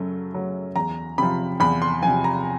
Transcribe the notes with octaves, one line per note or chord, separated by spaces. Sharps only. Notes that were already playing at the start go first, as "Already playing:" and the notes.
Already playing: F#2 C#3 F#3 A3
C#3 F#3 A3
E2 A#5
C3 F3 B5
E2 B5
C6
C3 F3 G#5
A#5